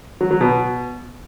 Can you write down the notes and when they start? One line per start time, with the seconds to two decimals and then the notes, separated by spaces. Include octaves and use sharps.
0.21 F#3
0.31 F#3
0.41 B2